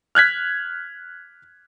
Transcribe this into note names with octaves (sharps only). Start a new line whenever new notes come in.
F6 F#6 G#6 B6